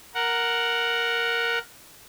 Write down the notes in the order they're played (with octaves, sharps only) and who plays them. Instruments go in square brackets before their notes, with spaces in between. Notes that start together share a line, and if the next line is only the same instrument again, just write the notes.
[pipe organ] A#4 F#5